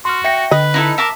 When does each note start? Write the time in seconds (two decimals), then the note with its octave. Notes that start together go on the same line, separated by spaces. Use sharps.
0.05 F#4 C6 F6
0.24 E5 G5 A#6 C#7
0.51 D3 B4 D#5
0.74 D#4 E4 A4
0.98 A#4 E5 A5 D6